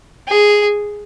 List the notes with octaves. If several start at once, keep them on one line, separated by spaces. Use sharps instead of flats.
G#4